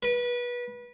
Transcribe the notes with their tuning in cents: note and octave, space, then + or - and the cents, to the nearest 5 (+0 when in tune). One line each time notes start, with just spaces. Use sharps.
B4 -25